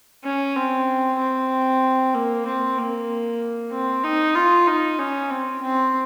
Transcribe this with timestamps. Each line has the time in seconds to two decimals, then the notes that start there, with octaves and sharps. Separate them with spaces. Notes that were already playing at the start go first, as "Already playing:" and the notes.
0.24 C#4
0.56 C4
1.18 C4
2.14 A#3
2.46 C4
2.78 A#3
3.72 C4
4.04 D#4
4.36 F4
4.67 D#4
4.99 C#4
5.31 C4
5.62 C4